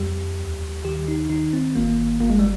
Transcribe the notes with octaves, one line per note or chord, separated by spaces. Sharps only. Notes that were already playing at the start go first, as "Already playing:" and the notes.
Already playing: F2 G3 G4
D#2
D#3 G4
D#4
D#3 D#4
C4
G1 A#3
G1 A#3
G#3
G3